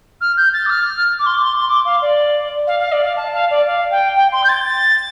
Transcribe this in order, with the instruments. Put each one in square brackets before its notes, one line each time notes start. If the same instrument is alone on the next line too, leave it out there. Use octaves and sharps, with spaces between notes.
[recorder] F6
G6
A6
D6
F6
D6
C6
D6
C6
C6
D6
F5
D5
F5
F5
D5
F5
A5
F5
D5
F5
G5
G5
C6
G6
A6